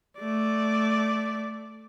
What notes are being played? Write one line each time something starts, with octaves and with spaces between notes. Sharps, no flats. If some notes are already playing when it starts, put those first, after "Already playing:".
A3 D5